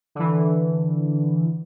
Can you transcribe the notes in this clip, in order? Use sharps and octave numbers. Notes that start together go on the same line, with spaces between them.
D3 E3